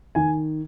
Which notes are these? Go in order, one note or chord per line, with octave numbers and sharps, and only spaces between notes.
D#3 G#5